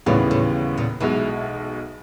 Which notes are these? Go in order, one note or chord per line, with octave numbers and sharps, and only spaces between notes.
D#2 A2 C#3 E3 G3 B3
A2
A#2
B1 B2 E3 G#3